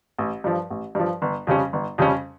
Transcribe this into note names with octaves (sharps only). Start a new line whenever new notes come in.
A1
G2 F3
A1
G2 F3
G1
F2 C#3 G3 C#4
G1
F2 C#3 G3 C#4